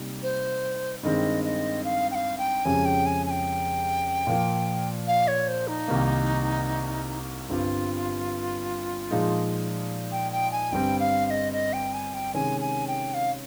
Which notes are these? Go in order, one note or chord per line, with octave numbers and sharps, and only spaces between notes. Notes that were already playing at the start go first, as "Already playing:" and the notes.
Already playing: C3 G3 A#3 D#4
C5
G2 D#3 G#3 C4 D#5
D#5
F5
G5
F5
G5
F2 C#3 G#3 C#4 G4 G#5
G5
G#5
G#5
G5
A#2 F3 A#3
F5
C#5
C5
D#4
C2 C3 D#3 A#3
G1 G2 G3 C4 F4 G4
A#2 F3 G#3 D#4
G5
G5
G#5
G1 G2 G3 C4 G5
F5
F5
D#5
D#5
G5
G#5
G5
C3 D#3 G#3 C#4 G#5
G#5
G5
F5